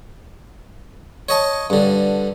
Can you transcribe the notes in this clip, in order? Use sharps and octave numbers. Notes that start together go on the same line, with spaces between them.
C#5 D#5 A5
G2 D3